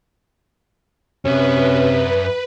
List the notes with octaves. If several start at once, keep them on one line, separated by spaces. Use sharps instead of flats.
F#2 C3 C#4 B4 E5